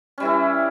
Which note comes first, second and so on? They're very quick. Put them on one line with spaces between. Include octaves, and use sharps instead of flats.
C#4 G3 E3 E4